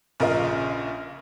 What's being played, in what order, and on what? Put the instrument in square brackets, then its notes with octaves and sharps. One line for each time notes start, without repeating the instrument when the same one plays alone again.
[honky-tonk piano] A#1 C#3 F4 A#4 D#5